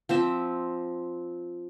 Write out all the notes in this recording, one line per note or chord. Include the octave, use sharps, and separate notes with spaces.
F3 C4 E5